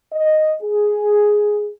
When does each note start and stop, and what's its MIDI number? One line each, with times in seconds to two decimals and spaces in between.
0.12 0.54 75
0.62 1.68 68